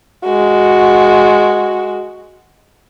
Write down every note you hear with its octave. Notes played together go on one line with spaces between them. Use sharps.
G#3 F#4